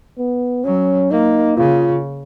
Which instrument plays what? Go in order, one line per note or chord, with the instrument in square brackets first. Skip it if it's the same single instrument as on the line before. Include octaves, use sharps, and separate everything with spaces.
[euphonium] B3
[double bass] F#3 [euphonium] C#4
[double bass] A#3 [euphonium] D#4
[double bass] C#3 [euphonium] F4